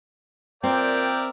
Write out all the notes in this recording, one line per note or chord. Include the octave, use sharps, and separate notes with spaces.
A#2 C4 A#4 D5 E5 G5